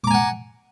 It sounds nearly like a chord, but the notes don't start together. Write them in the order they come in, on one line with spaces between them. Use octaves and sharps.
D6 A#5 G#5 F#5